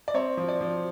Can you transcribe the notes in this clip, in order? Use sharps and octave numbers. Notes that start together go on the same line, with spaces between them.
D5
C4 C#5
F3
D5
F3